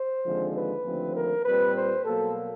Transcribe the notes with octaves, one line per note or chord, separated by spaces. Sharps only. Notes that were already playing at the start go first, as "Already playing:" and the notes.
Already playing: C5
D#2 D3 F3 G#3 C4
B4
D#2 D3 F3 A3 C4
A#4
A#2 G3 C4 B4
C5
B2 F#3 A#3 A4